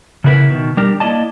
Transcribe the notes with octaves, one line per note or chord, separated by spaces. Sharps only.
C#3 E3 B3 E4 A#4 B4
B2 D#3
G3 D4 G4 A#4
A#3 E4 F4 D5 D#5 A5